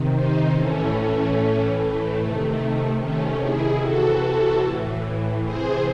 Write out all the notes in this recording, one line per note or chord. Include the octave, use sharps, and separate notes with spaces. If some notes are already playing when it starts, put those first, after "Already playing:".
Already playing: C3 D#3
C4 D#4
A2 E3 A3 C#4
A2 E3
A3
C3 D#3
C3 D#3 A3 C#4
E4 G#4
C3 E3 F#4 A4
F#4 A4
A2 E3
C3 E3 G#4 C5